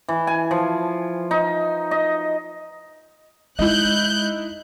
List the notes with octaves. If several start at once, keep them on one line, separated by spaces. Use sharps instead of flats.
E3
G#5
F3
D#4
D#5
G#3 D#4 E4 F#6 G6